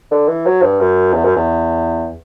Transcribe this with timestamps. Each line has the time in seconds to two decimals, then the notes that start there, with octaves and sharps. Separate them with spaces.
0.11 D3
0.28 E3
0.46 F#3
0.62 G2
0.80 F#2
1.13 E2
1.25 F#2
1.36 E2